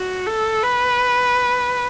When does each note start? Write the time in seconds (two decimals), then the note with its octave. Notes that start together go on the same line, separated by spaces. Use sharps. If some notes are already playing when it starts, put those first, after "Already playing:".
Already playing: F#4
0.26 A4
0.63 B4